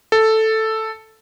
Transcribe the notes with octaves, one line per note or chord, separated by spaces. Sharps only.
A4